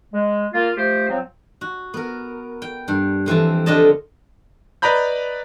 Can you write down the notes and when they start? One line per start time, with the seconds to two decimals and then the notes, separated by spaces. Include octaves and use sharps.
0.13 G#3
0.53 A#3 F4
0.77 F3 A3 G4 C5
1.09 F3 F#3 C4
1.61 F#4
1.94 B3 A#4
2.62 G5
2.88 G2
3.26 F2 E3 C4 A5
3.66 F2 D3 F4 G4 D#5 A5
4.82 B4 D5 D#5 A#5 B5 G6